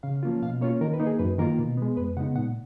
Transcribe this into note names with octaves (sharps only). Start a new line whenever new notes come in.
C#3 F5
F3 A#3 C#4 F4
B2 F5
A#3 C#4 F4 C#5
D#3 A#4
B4
A#3 D#4
G#4
F#2 B4
D#3 A#3 F4 A#4
B2
G#3 B3
F2 B4
C#3 G#3 B3 D#4 F#5
A#2 F#5